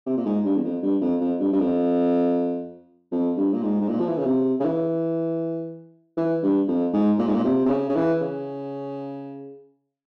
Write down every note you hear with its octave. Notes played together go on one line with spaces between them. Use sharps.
C3
A#2
G#2
G2
E2
F2
G2
F2
F2
G2
G2
F2
F2
G2
A#2
G#2
G#2
A#2
F3
E3
C#3
C3
C#3
E3
E3
G2
F2
G#2
A#2
G#2
A#2
C3
C3
C#3
C#3
E3
C#3